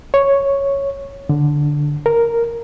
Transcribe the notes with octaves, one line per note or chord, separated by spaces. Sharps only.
C#5
D3
A#4